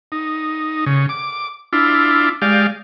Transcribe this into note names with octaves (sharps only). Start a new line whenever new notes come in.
D#4
C#3
D6
D4 E4 F4
G#3 G4 D5 F5